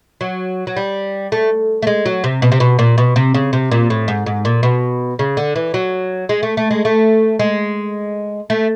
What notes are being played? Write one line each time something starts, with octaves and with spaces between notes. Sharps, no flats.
F#3
F#3
G3
A3
A3
G#3
F#3
C3
B2
C3
B2
A#2
B2
C3
C#3
C3
A#2
A2
G#2
G#2
A#2
B2
C#3
D3
E3
F#3
G#3
A3
A3
G#3
A3
G#3
A3